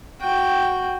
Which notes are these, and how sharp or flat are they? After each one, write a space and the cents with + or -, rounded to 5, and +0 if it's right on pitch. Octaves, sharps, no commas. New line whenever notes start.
F#4 +0 G5 +0